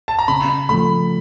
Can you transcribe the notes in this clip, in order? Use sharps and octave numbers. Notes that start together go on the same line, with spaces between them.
A5
A#5
C#3 B5
F3 A3 B5